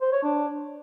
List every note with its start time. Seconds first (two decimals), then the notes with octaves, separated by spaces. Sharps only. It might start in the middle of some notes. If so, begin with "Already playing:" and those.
0.01 C5
0.12 C#5
0.23 D4